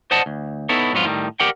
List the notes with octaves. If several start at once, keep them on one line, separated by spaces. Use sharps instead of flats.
C5 D5 D#5 F#5 A5
D2
B3 D#4 E4 A4 C#5
F2 G#2 F#3 B3 F4
A2 D#3 G3
G4 A#4 D5 F#5 G5